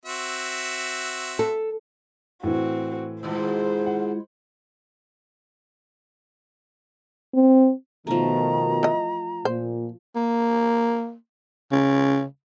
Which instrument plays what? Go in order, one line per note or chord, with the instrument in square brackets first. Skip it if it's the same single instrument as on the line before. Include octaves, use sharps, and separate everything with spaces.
[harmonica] C4 F#4 E5
[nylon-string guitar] A4
[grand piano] A2 E3 [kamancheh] C4 F#4
[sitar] D#2 G#2 B2 [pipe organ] G#3 E4 F4 [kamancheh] C5
[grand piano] F#5
[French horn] C4
[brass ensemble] B2 D#3 [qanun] F3 A3 [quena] A#5
[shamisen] E3 D#5
[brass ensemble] A#2 [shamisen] C5
[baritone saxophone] A#3
C#3